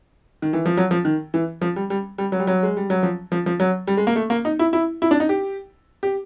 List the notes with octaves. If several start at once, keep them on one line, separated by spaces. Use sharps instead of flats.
D#3
E3
F3
F#3
F3
D#3
E3
F3
G3
G3
G3
F#3
G3
F#3
G#3
G3
F#3
F3
F3
F3
F#3
G3
G#3
A#3
A3
A#3
D#4
E4
E4
E4
D4
D#4
G4
G4